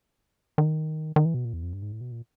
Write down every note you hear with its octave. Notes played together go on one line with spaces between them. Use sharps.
D#3
D#3
E3
B2
A#2
E2
F2
G2
G#2
A2
B2
A#2